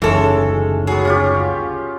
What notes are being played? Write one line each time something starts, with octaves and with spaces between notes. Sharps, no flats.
F#1 D2 G#2 E3 G#3 C#4 A4
F#3 B3 G#4
C#4 F4 G4